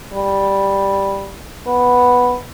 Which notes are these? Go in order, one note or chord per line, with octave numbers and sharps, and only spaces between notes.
G3
B3